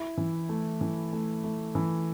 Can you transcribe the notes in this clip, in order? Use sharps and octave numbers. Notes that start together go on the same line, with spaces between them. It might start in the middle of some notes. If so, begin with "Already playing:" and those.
Already playing: E4
E3
A3
E3
A3
A3
E3